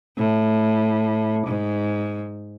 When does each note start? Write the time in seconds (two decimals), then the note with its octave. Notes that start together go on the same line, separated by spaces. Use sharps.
0.18 A2
1.47 G#2